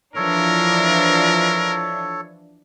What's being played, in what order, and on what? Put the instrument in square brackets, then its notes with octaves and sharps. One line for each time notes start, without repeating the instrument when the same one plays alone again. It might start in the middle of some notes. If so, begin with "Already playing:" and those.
[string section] E3 F3 D4 [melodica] A4 C#5 [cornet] A#4